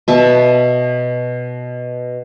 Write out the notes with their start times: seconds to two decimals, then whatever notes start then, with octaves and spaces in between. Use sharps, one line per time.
0.08 B2 E5 A5